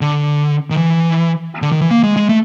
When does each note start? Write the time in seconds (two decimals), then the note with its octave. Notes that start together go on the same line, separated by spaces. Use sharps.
0.01 D3
0.70 D#3
0.77 E3
1.62 D3
1.72 D#3
1.81 E3
1.91 A#3
2.03 G#3
2.16 G#3
2.29 A3